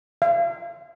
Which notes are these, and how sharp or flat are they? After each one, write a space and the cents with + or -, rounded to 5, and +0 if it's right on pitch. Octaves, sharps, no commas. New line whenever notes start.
F5 -45